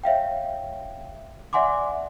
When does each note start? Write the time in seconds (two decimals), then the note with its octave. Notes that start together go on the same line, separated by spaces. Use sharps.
0.04 C#5 E5 F5 G5
1.53 D5 E5 F#5 G#5 C6 D6